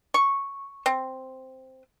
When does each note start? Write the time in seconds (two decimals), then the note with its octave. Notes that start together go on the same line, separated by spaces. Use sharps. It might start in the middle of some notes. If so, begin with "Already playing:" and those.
0.14 C#6
0.86 C4